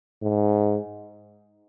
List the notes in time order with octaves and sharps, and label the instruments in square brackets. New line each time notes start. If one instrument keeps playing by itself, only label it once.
[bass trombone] G#2